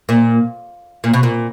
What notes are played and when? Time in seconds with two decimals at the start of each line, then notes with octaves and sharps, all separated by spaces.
0.09 A#2
1.04 A#2
1.14 B2
1.23 A#2